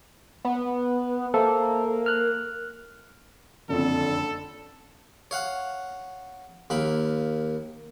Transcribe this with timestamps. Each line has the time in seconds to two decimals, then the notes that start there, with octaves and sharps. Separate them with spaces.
0.45 B3
1.34 A#3 A4 C5 E5
2.06 F6 F#6
3.69 F#1 F2 D3 A4
5.31 C#5 F5 F#5
6.70 D#2 A#3 B5